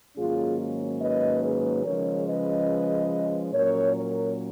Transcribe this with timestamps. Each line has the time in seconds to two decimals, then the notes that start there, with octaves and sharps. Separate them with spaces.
0.16 G#2 D#3 F#3 A#3 C#4 F4 G#4
1.01 B4 D#5
1.43 G#4 B4
1.85 C#3 F3 G#3 C#4 A#4 C#5
2.28 B4 D#5
3.53 A#2 F#3 C#4 A#4 C#5
3.96 A#4 C#5